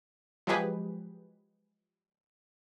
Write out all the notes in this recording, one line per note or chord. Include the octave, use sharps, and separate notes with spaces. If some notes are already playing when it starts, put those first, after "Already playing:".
F3 F#3 G#3 G4 G#4 B4